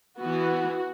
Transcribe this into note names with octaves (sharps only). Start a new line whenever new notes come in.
E3 B3 F#4